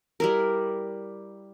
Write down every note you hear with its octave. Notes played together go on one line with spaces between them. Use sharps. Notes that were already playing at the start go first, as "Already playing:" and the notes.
G3 E4 A#4